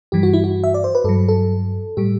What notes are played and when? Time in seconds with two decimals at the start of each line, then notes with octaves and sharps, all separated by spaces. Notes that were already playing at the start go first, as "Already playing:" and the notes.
0.12 G2 E3 G3 G4
0.23 F#4
0.33 E4
0.44 F#4
0.64 E5
0.74 D5
0.84 C5
0.95 B4
1.04 G2 F#3 A4
1.28 A4
1.97 A2 G3 G4